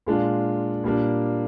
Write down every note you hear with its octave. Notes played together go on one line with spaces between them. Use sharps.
A#2 G#3 D4 F4
A#2 G3 A#3 D4